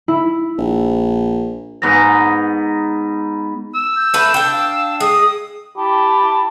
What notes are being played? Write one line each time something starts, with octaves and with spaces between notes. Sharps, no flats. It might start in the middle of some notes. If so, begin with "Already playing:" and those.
E4
A#1
G#2 B3 D#5 A#5
E6
G6
A3 B4
D4 G5
F5
G#3 D#6
E4 G4 A5 B5